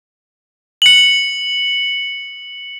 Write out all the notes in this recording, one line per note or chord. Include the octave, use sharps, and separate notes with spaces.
C#7 F#7